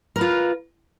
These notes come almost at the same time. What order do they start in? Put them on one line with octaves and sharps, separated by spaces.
A#4 B4 F4